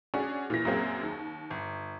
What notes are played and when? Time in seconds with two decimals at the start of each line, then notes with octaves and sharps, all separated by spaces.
0.14 C#4 D4 F#4 G#4
0.50 A#2 E3 A#6
0.65 F#2 F#3 A#3 C4 G#4
1.03 D#2
1.50 G1